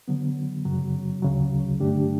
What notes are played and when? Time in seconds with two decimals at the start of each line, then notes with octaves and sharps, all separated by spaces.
0.08 D3 F#3 B3
0.65 F#2 C#3 F#3
1.22 D2 C#3 F#3
1.80 G2 D3 A3 D4 G4